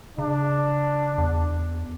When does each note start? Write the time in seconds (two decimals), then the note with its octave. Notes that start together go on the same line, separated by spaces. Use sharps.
0.18 C#3 D4
1.18 E2